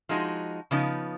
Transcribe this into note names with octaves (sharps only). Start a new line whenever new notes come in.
F3 G#3 D#4 F#4
C#3 F3 B3 D#4